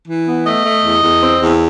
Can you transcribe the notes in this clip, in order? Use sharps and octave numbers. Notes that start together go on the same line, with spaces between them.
E3
B3
A3 D#5
A3
E2
E2
C4
E2